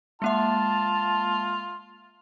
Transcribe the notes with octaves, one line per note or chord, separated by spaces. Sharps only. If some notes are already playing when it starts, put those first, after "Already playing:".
G#3 A#3 F4 E5 A5